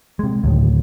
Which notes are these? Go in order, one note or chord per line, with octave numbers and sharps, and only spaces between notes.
C3 G#3
D2 A2 D#3